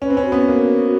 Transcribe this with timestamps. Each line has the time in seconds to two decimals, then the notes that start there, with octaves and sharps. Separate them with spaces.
0.01 C#4 B4
0.10 C4
0.17 C#4
0.25 F#4
0.32 B3
0.48 A#3